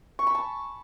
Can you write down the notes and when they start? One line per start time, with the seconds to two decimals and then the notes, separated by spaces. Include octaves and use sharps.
0.19 C#6
0.27 B5
0.35 A5